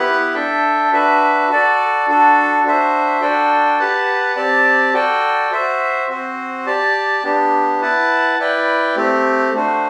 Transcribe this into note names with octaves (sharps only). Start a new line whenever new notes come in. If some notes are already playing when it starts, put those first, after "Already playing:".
Already playing: B3 E4 G4 B4 F#5
D4 A4 E5 G5
D4 F#4 B4 E5
F#4 A4 D5
D4 F#4 A4
D4 F#4 C5 E5
D4 F#4 A4 D5 G5
G4 B4 F#5 A5
C4 G4 D5 A5
F#4 A4 D5 G5
F#4 C5 E5
C4 F#4 C5
G4 D5 A5
B3 D4 G4
E4 B4 F#5 A5
E4 B4 D5 G5
A3 C4 G4
A3 D4 F#4 C5